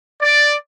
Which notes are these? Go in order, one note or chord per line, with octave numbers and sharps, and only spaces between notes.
D5